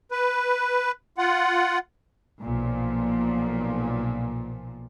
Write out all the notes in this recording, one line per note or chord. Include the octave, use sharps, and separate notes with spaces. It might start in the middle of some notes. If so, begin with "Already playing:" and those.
B4
F4 F#5
B1 A#2 F3